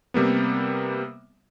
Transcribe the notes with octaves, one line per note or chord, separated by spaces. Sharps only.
C3 G3 A#3 B3